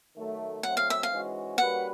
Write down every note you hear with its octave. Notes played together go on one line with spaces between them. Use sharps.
D#3 F#3 A3
F#3 A3 C4 F#5
F5
E5
F5
G#2 E3 G#3 C#4 F#4
G3 A#3 C#4 F#4 B4 F#5